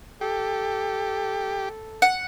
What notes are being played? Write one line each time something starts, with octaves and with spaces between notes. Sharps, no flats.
G4 A4
F#5